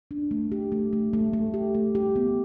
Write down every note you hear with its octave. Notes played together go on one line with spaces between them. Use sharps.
D4
A3
G4
A3
A3
A3
A3
G4
A3
G4
B3